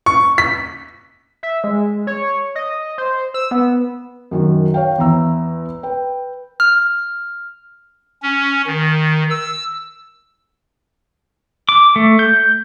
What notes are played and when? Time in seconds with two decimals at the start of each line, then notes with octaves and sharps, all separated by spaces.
0.06 C#6
0.38 B6
1.43 E5
1.64 G#3
2.07 C#5
2.55 D#5
2.98 C5
3.34 E6
3.51 B3
4.31 F#2 D#3 F#3
4.74 C#5 F5 G5
4.98 E2 E3 A#5 E6
5.83 B4 G5
6.60 F6
8.23 C#4
8.67 D#3
9.30 E6
11.69 D6
11.96 A3
12.19 G6